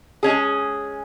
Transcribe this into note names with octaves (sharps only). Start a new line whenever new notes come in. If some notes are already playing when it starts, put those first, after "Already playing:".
G#3 C#4 G#4